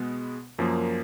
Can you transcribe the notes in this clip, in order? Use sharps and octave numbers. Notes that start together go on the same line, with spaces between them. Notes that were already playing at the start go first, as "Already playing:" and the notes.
Already playing: B2 G#3 B3
F#2 F3 A#3